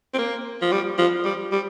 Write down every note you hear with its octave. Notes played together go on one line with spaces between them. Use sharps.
C4
A#3
F3
G3
F3
G3
G3